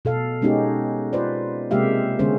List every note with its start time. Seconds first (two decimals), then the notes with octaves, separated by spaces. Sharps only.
0.05 B2 A4 F5
0.42 G#3 B3 C#4 D#4 G4
1.13 F4 B4 C5 D5
1.71 C3 G#3 A#3 G4 E5 F5
2.19 D3 G#3 B3 C#4 C5